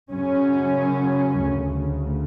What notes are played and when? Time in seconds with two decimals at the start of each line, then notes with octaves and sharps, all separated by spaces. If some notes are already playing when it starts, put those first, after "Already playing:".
0.10 F#2 C#3 C#4
1.40 D2 C#3